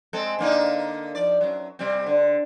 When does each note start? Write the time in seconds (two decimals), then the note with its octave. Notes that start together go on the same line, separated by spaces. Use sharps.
0.13 G#3 C4 A4
0.39 D3 A#3 D#4
1.15 F3 D5
1.41 F#2 F#3
1.79 C3 G3 C4
2.07 D3